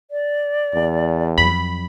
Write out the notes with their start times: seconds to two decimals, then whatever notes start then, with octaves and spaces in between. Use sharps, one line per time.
0.11 D5
0.74 E2
1.38 F2 F#3 B5